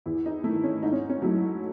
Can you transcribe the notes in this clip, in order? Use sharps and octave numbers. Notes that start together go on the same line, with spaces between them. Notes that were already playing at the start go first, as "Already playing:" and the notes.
E2 E4
D#4
D#3 A3 E4
C#4
G#2 D#4
C#4
C#4
F#3 A3 E4